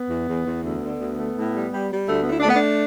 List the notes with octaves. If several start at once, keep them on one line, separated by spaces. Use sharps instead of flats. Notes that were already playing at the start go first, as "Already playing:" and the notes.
Already playing: B3
E2
E2
E2
D2 B3
D3
D2
A3
A2
G3
G3
G3
D2 A3
B3
A3
E4
D4
A3 B3
D4